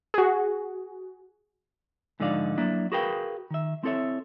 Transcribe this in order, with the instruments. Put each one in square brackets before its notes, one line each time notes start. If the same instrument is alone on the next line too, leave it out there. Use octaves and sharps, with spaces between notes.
[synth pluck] F#4 G#4
[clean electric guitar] G#2 D3 F3 D#4 D5 F5
F#3 A#3 D4 E4
F#4 G#4 A#4 B4 F5 G5
D#3 E5
C4 E4 A4 C#5 E5